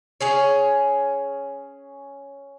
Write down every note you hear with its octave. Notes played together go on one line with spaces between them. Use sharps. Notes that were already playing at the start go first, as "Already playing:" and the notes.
C#4 G#4 C#5